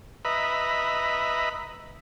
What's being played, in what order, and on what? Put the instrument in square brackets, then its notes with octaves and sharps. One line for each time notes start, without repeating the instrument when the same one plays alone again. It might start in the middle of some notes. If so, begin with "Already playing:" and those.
[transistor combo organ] B4 D#5 E5 A#5 B5